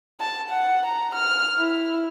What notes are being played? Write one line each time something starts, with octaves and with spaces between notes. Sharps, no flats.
A5
F#5
A#5
F6
E4